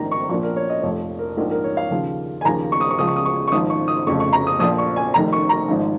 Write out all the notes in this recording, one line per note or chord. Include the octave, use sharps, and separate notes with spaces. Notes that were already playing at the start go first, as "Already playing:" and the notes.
Already playing: A#1 G#2 D#3 A#5
C#6
A#1 A#2 F3 C#6
A#4
C#5
D#5
F1 F2 F3 C#5
A#4
A#1 G#2 F3 A#4
A#4
C#5
F5
D#2 C#3 F3
G#5
D#2 C#3 F3 A#5
C#6
D#6
C#6
C#2 C#3 F3 D#6
C#6
D#6
C#6
C#6
G#1 G#2 F3 D#6
C#6
D#6
F1 F2 C#3 F3 C#6
C#6
A#5
D#6
A#1 A#2 F3 D#6
C#6
G#5
F1 F2 D#3 A#5
C#6
A#5
G#1 G#2 F3